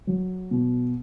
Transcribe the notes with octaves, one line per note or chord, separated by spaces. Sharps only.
F#3
B2